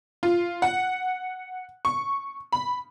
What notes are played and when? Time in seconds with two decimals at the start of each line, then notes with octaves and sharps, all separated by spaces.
0.23 F4
0.62 F#5
1.85 C#6
2.52 B5